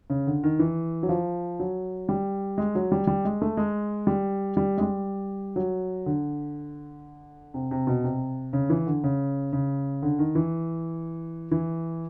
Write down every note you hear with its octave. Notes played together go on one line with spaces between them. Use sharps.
C#3
D3
D#3
E3
F#3
F3
F#3
G3
G#3
F#3
G3
G3
G#3
A3
G#3
G3
G3
G#3
G3
F#3
D3
C3
C3
B2
C3
C#3
E3
D3
C#3
C#3
D3
D#3
E3
E3